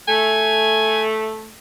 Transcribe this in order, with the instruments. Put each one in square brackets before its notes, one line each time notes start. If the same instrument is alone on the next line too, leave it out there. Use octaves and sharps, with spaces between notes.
[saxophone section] A3 [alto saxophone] G#5